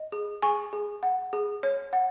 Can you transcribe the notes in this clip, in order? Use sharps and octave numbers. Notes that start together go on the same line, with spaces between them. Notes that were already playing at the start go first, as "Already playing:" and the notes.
Already playing: D#5
G#4
G#4 G#5 C#6
G#4
F#5
G#4
C#5
F#5